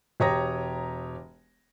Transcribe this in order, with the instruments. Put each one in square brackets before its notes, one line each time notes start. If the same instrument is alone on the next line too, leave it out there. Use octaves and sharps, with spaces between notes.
[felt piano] E1 G4 C#5 A#5 D#6 A#6